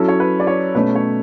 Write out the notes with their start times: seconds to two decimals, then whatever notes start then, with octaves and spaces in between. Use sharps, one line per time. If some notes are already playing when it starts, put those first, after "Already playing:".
Already playing: F#3 C#4 E4 A4
0.08 C#5
0.20 B4
0.40 D5
0.47 C#5
0.75 B2 A3 C#4 B4
0.95 C#5